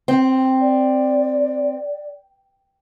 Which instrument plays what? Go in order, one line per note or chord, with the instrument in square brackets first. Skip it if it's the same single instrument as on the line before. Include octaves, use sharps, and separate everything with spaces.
[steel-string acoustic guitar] C4
[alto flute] D5